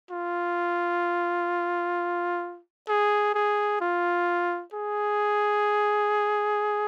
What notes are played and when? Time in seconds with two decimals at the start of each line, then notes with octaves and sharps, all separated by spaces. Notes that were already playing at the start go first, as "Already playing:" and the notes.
0.11 F4
2.88 G#4
3.35 G#4
3.81 F4
4.73 G#4